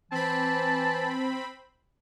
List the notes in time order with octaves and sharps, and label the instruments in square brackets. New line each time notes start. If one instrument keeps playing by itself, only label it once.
[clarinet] E3 [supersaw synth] C4 B5 [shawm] A5